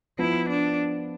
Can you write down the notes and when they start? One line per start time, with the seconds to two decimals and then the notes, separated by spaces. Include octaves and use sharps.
0.19 F3 B3 E4 F4
0.49 D4